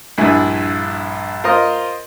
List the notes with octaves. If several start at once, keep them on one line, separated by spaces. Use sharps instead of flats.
A#1 G2 E4 G#5
F4 A#4 C5 D#5